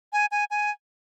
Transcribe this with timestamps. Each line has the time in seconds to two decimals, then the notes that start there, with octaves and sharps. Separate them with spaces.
0.13 G#5
0.31 G#5
0.51 G#5